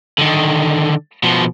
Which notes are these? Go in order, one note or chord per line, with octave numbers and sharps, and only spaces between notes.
D3 D#3
B2 F3